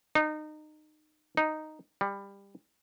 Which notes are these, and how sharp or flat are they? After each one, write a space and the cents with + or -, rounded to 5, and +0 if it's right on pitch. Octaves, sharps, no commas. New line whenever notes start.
D#4 -25
D#4 -5
G3 +20